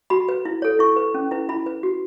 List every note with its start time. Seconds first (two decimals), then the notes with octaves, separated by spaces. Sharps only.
0.10 F#4 B5
0.29 B4
0.45 E4
0.62 A4 C#5
0.79 E4 C#6
0.96 B4
1.14 C#4
1.31 E4 B4
1.49 E4 B5
1.66 B4
1.83 F#4